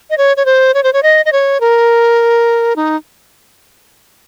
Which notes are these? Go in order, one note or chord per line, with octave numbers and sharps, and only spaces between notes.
D#5
C#5
C#5
C5
C#5
C5
C#5
D#5
D#5
C#5
A#4
D#4